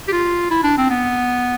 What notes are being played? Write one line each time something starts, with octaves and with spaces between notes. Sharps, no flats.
G4
F4
E4
D4
C4
B3